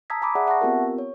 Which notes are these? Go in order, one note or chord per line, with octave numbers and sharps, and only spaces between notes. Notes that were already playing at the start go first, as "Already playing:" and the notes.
A5 A#5 D#6 E6 G#6 B6
G#5 A#5 B5 D6 D#6
G#4 D5 E5 F#5
E5 F#5 A5 C#6 A#6
B3 C4 F4 G4 A#4
C#5